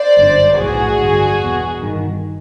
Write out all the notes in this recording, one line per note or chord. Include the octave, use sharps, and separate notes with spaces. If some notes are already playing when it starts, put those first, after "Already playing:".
Already playing: C5 D5
G1 F#2 D3
B1 A2 E3 F#4 G#4
G1 G2 D3
E2 B2
G1 G2 D#3